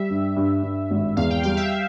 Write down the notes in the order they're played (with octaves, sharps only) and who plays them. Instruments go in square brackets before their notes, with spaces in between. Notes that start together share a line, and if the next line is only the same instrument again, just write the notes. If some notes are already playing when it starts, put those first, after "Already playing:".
Already playing: [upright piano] G3 [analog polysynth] E5
[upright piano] G2
G2
G2
G#1
[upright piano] E2 [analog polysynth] F5
[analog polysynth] G5
[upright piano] G3 [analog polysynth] F5
[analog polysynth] E5